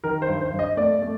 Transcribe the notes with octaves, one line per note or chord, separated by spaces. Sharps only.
D#3 A#4
C5
G2
C5
G2
D#5
A3 D5
A3